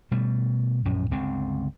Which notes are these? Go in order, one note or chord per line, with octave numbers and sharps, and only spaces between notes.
B2 G3 A3
A#1 F#2 A2 C#4
G1 C#2 D3 C4